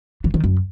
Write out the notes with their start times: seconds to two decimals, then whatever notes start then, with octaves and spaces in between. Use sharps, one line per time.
0.24 E3
0.34 D#3
0.44 F#2